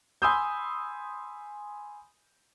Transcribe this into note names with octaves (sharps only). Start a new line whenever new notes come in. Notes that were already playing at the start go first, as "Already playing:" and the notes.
G#5 B5 C6 D#6 E6 G6